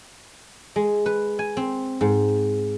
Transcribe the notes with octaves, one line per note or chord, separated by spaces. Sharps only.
G#3
B4
G#5
C4
G#2